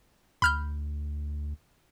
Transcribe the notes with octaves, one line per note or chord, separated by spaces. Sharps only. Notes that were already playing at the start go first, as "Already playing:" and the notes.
D2 B5 F6 G6